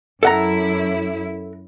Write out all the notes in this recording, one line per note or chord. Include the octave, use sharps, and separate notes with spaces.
F#2 E4 A4 F#5 A#5